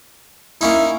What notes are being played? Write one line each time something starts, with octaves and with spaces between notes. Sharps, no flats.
A#3 C#4 D#4 E4